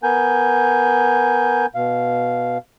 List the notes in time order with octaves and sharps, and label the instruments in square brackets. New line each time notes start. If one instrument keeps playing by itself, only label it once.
[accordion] B3 A#4 G#5 G6
B2 F5